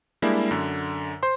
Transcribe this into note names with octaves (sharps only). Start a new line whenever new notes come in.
G3 G#3 A#3 D4 E4 G4
F#2 D3
C5 C6